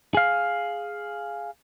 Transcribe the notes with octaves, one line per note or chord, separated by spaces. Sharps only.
G#4 F5